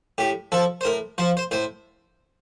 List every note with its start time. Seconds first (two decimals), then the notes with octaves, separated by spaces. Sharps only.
0.18 A2 G4
0.52 F3 A4
0.81 C5
0.85 A2 A#4
1.18 F3 C5
1.37 C5
1.51 A2 C5